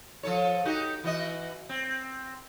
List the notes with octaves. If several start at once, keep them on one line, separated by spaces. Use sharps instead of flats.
F3 A4 C#5
D#4 F#4 G4
E3 F#4 D#5
C4